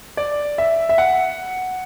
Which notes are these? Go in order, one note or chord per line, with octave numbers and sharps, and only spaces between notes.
D5
E5
E5
F#5